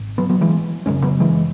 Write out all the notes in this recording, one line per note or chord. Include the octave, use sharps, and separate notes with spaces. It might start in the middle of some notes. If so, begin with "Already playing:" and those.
Already playing: G#1 G#2
F#3 B3
F#3 B3
E3 G#3
F#1 F#2 C#3 G#3 C#4
F#3 B3
E3 G#3